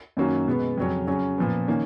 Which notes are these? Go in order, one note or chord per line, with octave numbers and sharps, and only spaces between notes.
F#2 D#3 A#3 C#4 F#4
B2 G#3 B3
F2 C#3 F#3 C#4
C#3 F#3 C#4
A#2 F3 B3
D#3 A#3 C#4